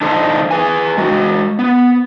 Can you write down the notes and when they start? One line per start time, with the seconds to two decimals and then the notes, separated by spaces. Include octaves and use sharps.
0.01 D4 D#4 A4 C5
0.51 G#4 B4 G#5
0.98 G#3 F#4
1.59 B3